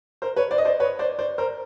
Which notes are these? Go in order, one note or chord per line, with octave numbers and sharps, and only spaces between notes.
A#4 C5
B4 C#5
C5 D5
D#5
C5 D5
B4 C#5
C5 D5
C5 D5
A#4 C5